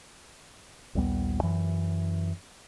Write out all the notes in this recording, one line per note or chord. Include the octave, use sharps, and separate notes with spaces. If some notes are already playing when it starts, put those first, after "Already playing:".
A#1 D#2 G3 B3
F#2 E3